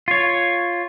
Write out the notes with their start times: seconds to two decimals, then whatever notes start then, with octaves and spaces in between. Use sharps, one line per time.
0.08 F4 C#5